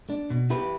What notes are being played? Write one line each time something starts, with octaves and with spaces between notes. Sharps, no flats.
D4
B2
E4 G4 B4